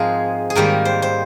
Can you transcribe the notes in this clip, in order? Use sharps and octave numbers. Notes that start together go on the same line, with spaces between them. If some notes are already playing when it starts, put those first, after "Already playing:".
Already playing: G#2 F3 G#3 C4 G#4 A#4
G#4
G#2 D#3 G3 A#3 A#4
C5
C5